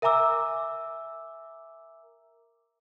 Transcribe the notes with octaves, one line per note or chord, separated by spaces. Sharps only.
A#4 E5 G#5 A#5 D6 E6